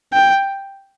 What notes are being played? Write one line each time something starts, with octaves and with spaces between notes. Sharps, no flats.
G5